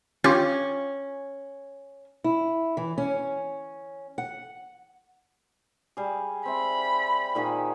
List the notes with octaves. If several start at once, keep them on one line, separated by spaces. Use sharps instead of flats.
C#4 F4 G4
E4
E3
C#4
F#5
G3 G#4
C4 E5 B5
A#2 D#3 G#4